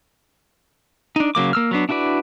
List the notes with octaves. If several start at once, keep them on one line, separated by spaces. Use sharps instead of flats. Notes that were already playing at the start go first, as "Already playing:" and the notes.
D4 D#4
C#3 F#3 A#3 D6
A#3 E6 F6
F#3 B3 D4
D4 E4 F#4 B4 D5